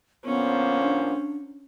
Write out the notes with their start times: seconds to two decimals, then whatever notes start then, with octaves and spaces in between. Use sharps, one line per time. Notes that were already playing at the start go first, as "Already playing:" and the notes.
0.24 A#2 D3 F3 B3 C#4
0.82 D4